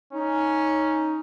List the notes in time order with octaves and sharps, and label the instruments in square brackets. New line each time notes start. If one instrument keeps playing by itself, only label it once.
[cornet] C#4 [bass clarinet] D#4